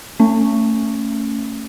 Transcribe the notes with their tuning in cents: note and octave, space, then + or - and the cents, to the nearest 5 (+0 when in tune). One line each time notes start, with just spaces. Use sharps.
A3 +30 C#4 +0